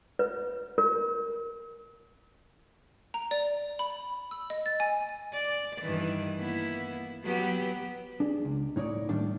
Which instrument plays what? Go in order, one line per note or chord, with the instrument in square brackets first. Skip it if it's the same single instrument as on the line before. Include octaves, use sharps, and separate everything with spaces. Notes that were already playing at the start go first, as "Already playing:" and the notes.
[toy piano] B4
A#4
[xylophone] A#5
D5
B5
E6
D#5
A6
G#5
[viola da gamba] D5
G2 D#3 E3
A#3 B3 E4
F#3 B3 G4
[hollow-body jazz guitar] D4 G#4
C#2
A2 D#4 C#5 D5
A2 D#3 G3 A#3 D4